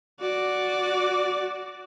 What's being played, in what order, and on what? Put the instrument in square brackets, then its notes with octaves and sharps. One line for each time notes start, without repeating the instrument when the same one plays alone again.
[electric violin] F#4 D5